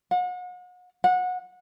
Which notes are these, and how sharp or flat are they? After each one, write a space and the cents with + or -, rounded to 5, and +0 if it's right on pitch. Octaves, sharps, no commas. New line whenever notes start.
F#5 -40
F#5 -20